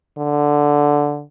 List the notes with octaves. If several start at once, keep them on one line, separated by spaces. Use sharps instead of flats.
D3